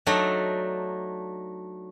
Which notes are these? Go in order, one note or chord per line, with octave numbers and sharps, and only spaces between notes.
F#3 A3 D4 D#4